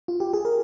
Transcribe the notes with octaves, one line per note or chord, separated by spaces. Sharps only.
F4
G4
G#4
A#4